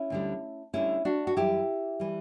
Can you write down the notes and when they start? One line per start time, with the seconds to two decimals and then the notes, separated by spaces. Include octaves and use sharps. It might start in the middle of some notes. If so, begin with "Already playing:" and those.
Already playing: C#4 E4
0.10 D2 D3 G3
0.73 D2 D3 G3 C#4 E4
1.05 D4 F#4
1.27 F#4
1.36 F#2 E3 G3 E4 G4
2.00 E3 G3